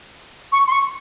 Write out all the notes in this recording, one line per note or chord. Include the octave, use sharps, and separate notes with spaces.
C#6
C6
C#6